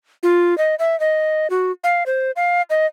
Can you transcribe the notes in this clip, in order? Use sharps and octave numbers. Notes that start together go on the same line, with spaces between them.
F4
D#5
E5
D#5
F#4
F5
C5
F5
D#5